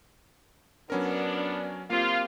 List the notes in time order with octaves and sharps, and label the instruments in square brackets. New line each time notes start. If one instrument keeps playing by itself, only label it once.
[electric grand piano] F#3 C#4 A#4 [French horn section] B3 D4
[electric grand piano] A#3 C4 G4 [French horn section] F4